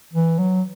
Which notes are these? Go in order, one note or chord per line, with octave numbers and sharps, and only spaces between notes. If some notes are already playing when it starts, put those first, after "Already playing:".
E3
F#3